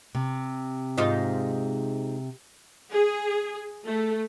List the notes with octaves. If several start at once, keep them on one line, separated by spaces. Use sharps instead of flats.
C3
G#2 D#4 F4
G#4
A3